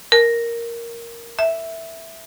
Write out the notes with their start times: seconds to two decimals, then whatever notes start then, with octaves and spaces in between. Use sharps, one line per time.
0.12 A#4
1.39 E5